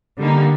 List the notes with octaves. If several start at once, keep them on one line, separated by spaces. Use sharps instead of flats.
D3 G3 A#3 D#4